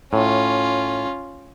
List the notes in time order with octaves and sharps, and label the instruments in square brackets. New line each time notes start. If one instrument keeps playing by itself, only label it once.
[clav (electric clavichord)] A2 [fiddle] C#4 F4